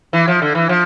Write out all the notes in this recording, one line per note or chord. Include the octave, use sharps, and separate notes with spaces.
E3
F3
D3
E3
F3